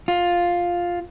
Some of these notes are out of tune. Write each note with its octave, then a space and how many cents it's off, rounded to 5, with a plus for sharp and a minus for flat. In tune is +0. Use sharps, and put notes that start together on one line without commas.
F4 +5